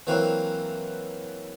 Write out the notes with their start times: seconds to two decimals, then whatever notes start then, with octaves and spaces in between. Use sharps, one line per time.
0.07 E3 F#3 A#3 C4